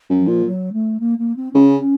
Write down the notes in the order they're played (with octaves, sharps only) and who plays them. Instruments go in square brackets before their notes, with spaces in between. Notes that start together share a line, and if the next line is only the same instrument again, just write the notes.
[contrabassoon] F#2
[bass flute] F3
[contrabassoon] A#2
[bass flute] F#3
A3
A#3
A#3
C4
[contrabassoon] C#3 [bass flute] C#4